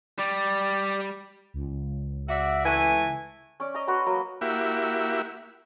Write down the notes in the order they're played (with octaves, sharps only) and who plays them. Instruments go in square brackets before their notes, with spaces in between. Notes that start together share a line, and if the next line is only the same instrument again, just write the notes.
[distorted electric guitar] G3 [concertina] D5
[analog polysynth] C#2
[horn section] F#4 D5 E5
E3 A3 G#5
[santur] C#4 D5
D#5 A#5
F#4 B4 A#5 C6
F#3 A#3
[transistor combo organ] A#3 E4 F#4 G4 E5